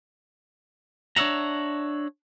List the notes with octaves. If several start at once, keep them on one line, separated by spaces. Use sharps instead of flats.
D4 C#5 D#5 E5 F#5 A#5